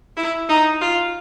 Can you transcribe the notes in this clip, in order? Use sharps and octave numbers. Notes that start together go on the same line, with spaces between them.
E4
D#4
F4